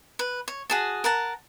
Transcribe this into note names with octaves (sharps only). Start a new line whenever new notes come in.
B4
C#5
F#4 G#4 A5
A#4 F#5 A5